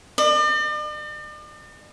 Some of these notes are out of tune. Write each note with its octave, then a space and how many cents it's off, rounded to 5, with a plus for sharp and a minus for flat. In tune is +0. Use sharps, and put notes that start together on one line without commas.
D5 +45